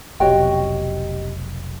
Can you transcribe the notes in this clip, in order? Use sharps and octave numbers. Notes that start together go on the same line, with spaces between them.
F1 B1 F#4 G4 C#5 D#5 G5